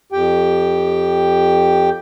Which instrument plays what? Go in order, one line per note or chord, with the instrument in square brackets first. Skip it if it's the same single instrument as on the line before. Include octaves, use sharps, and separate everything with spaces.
[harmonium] F2 G4 G5